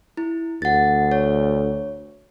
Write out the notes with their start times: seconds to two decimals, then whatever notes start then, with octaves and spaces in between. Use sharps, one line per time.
0.17 E4
0.62 D2 F#5 A6
1.11 C#5